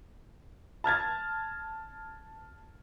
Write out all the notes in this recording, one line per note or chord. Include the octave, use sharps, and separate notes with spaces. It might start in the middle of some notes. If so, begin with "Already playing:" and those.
A5 F6 G#6 A6